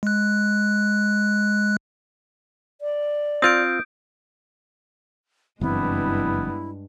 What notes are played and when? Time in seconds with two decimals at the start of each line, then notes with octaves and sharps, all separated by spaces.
0.03 G#3 F#6
2.80 D5
3.42 C4 F4 D#6 G6 D7
5.61 F#1 G2 E3 G#3 B3 C4 E4